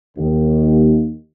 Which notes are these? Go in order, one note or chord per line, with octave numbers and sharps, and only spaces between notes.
D#2